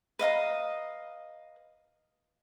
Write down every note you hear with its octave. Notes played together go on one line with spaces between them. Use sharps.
B4 D#5 F5 A#5